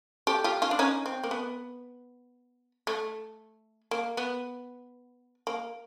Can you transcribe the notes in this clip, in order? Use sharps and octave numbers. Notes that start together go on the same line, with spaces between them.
G4 A4
F4 G4
D#4 F4
D4
C#4 D#4
C4
A#3
B3
A3
A#3
B3
A#3